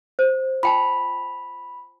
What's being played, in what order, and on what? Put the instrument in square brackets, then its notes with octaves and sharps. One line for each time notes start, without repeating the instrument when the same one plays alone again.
[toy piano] C5
[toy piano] F4 G5 A5 [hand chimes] B5